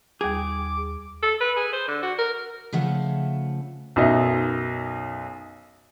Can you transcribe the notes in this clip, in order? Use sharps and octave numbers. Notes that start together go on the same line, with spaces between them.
D#2 G3 G#4 D6 G#6
A4
B4
G#4
C5
D3
F#4
A#4
C#3 F3 A3 F#5
B1 F#2 D#4 D#5 E5